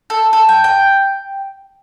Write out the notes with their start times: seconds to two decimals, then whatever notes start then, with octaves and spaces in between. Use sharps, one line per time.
0.10 A4
0.33 A4
0.49 G5
0.64 G5